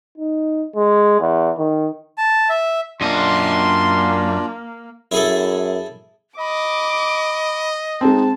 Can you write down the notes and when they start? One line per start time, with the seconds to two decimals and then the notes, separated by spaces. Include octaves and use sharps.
0.17 D#4
0.76 G#3
1.20 E2
1.58 D#3
2.18 A5
2.49 E5
3.01 F#2 A#3 D4 F4 D5 D#5 C6
5.12 F#2 E4 G#4 A4
6.39 D#5 B5 D6
8.01 G#3 C4 D#4 A5